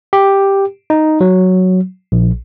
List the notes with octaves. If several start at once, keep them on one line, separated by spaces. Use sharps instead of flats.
G4
D#4
F#3
A#1